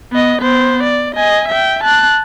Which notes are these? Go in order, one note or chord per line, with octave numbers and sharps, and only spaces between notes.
B3 D#5
B3 C5
D5
D#5 G#5
E5 G5
A5 F#6